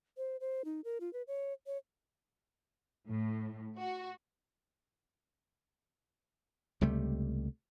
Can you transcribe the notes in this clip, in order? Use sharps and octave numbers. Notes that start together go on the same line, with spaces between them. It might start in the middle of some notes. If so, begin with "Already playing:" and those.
C5
C5
D#4
A#4
F4
B4
C#5
C#5
A2
F#4
C#2 C3 G3 A3